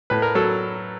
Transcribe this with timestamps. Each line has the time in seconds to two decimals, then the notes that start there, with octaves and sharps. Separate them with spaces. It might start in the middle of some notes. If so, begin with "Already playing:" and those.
0.10 A2 B4
0.22 A#4
0.35 F#3 A4